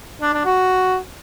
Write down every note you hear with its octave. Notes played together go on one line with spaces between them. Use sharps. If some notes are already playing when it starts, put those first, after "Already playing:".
D4
D4
F#4